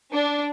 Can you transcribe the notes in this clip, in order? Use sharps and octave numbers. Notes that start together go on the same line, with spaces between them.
D4